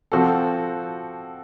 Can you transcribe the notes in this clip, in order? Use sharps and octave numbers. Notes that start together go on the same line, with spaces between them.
F3 C4 F#4 A4